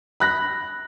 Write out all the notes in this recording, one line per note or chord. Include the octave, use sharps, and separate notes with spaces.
B5 F#6 A#6